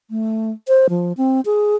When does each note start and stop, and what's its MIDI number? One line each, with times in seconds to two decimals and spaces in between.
0.10 0.51 57
0.68 0.87 72
0.89 1.13 53
1.17 1.41 60
1.46 1.76 68